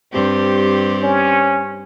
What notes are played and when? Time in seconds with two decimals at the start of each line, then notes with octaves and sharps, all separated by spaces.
0.13 G2 C4 G4
1.03 C#4